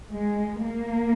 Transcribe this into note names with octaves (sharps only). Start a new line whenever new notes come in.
G#3
A#3